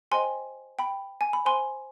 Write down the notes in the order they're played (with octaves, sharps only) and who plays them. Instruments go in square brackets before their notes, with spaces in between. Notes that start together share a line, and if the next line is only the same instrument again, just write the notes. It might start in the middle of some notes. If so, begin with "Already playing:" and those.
[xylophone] G4 C5 D#5 G5 G#5 C6
G5 B5
G#5
B5
C5 F5 G#5 C6